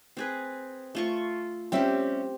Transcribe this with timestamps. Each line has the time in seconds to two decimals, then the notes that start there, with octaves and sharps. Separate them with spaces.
0.17 C4 G#4 B4
0.95 A3 F4 C#6
1.72 G3 C4 C#4 G4 E5